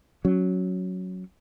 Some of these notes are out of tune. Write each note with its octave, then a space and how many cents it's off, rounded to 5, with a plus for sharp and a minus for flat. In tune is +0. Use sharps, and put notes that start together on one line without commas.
F#3 +0 C#4 +0